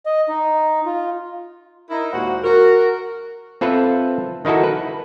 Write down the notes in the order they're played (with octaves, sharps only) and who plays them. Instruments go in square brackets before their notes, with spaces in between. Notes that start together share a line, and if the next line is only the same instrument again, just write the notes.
[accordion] D#5
D#4
F4
[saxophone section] D#4 E4 A#4
D#2 A#2 G#3 F#4 C5 F#5
F#4 A#4
[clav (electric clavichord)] C4 F4 A4 B4 E5
D#3 D#4 E4 F#4 A4
B4